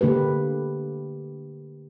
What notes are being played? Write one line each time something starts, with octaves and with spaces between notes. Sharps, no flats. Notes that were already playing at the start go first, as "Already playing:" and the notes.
D3 A#3 G4 B4